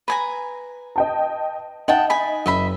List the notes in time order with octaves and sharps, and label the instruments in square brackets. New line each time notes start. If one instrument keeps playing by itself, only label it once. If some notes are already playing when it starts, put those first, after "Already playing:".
[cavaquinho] B4 G#5 A#5
[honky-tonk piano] D#5 G5 A5
[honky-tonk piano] D#4 D#5 E5 [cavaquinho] F#5 G5 A5
[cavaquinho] G#5 B5
[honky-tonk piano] F#1 [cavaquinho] D#5 E5 B5